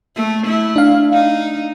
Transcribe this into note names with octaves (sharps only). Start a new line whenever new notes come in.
A3
A3 E4
D4 F5
D#4